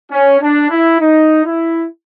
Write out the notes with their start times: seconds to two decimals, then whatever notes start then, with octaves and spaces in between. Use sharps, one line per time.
0.11 C#4
0.41 D4
0.70 E4
1.00 D#4
1.45 E4